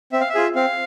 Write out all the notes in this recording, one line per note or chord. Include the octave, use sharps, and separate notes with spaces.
C4 E5
F5
E5
F4 G#4
C4 F5